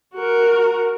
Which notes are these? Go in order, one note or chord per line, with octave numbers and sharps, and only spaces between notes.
F#4 A#4